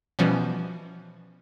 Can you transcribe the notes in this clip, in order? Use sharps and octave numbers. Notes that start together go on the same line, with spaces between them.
B2 E3 F3 G3 B3 C#4